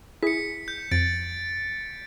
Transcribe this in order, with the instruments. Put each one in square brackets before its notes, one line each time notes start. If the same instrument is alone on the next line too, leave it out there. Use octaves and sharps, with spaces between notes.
[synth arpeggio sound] E4 G#4 [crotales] B6 C#7
[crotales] G6
[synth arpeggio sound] F2 [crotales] A6 D7